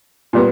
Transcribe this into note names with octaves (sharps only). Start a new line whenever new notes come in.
A#2 G3 B3